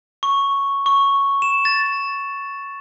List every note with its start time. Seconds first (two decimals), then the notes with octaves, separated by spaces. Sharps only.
0.23 C#6
0.86 C#6
1.42 E7
1.65 A6